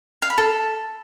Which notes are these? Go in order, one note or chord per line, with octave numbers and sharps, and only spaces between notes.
F5
B5
A4